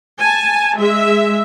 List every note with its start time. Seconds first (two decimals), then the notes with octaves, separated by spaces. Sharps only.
0.18 G#5 A5
0.78 G#3 E5